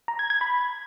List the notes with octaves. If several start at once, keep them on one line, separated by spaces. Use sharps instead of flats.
A#5
G#6
G#6
B5